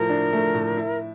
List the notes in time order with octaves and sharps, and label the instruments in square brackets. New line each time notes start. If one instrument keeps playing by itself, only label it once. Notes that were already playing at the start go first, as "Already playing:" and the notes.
Already playing: [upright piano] A2 F3 A3 [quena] A#4
[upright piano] D4
A3
A2
E4